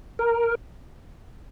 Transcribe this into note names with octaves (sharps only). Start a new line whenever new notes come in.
A#4